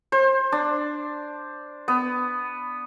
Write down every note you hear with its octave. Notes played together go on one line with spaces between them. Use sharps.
C5
D4
B3